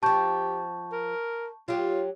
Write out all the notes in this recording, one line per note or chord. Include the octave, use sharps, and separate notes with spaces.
F3 C4 G4 A5 C#6 G6
A#4
F#3 F4 G4